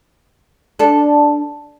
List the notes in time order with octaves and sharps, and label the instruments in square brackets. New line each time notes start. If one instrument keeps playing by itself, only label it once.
[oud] D4 A4